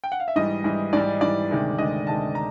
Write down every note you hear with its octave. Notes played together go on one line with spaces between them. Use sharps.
G5
F#5
F5
E5
G#2 E3 G3 D#5
G#2 E3 G3
G#2 E3 G3 D5
G#2 E3 G3 D5
D2 C3 D#3 G#3
D2 C3 D#3 G#3 D#5
D2 C3 D#3 G#3 A5
A#5